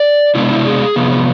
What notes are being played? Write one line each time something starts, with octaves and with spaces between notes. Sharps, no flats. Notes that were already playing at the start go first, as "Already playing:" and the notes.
Already playing: D5
C3 G#3 B3 D4 E4
E4
G#4
C3 F3 B3